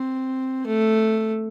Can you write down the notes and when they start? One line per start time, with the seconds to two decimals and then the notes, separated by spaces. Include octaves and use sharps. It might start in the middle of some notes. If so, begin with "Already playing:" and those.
Already playing: C4
0.67 A3